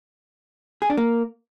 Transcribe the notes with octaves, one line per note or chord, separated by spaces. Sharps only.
G#4
D4
A#3